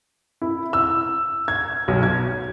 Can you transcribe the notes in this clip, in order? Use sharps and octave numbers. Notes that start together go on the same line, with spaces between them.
E4
E6
G#6
B1
G#6